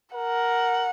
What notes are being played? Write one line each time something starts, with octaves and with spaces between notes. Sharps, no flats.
A#4 F#5